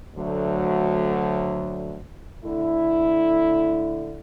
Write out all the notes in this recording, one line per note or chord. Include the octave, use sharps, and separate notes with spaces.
D2 D3 F#3 A3
D3 A3 E4